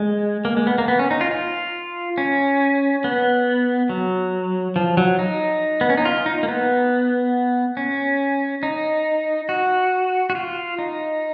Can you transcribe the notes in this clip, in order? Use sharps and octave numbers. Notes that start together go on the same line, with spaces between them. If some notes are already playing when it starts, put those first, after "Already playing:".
Already playing: G#3
A#3
G#3
B3
A#3
B3
C#4
D#4
F4
F4
C#4
B3
F#3
F3
F#3
D#4
B3
C#4
D#4
F4
D#4
A#3
B3
C#4
D#4
F#4
F#4
F4
D#4